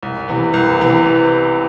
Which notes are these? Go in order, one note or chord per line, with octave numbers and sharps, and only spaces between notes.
C2
C3 E3 B3
C2
C3 E3 B3